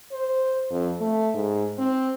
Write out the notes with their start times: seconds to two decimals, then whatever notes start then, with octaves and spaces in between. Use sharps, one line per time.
0.12 C5
0.71 F2
1.00 A3
1.34 G#2
1.78 C4